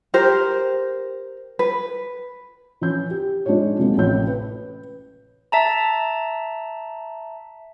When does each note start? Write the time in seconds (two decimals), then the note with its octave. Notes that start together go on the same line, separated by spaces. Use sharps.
0.14 G4 A#4 C5
1.59 B4
2.81 E3 C#4 G6
3.11 G4
3.46 G#3 D4 D#4 F4 C#5
3.78 C3 F#3 G#3 A#3
3.98 A1 A2 C#5 G6
4.28 B4
5.52 E5 A5 A#5